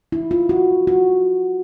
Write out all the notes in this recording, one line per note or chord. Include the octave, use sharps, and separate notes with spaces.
E4
F4
F#4
F#4